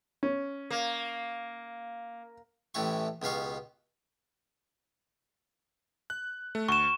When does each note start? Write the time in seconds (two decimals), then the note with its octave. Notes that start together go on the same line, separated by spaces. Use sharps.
0.23 C#4
0.70 A#3
2.74 A1 A2 E3 G4 C#6
3.22 C#2 B2 G4 F5 C#6
6.10 F#6
6.55 A3
6.68 D2 C#6 E7